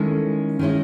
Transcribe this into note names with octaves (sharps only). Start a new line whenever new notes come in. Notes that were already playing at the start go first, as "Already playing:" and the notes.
Already playing: D#3 G#3 C#4 E4 A4
D#3 G#3 C#4 E4